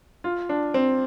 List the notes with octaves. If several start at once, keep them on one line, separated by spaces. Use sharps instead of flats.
F4
D4
C4